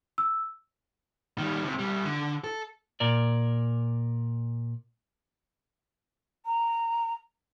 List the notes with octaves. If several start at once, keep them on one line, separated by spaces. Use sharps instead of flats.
E6
D#3 G3
C#2 C3
C2 G3
D3
A4
A#2 A#4 D5
A#5